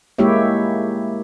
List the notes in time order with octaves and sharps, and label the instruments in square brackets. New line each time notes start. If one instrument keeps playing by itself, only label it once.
[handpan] G#3 A#3 E4 G4 C#5 E5